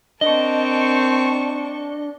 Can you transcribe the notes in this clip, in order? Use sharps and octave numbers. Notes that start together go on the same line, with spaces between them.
C4 D4 A#4 D#5 A5 C#6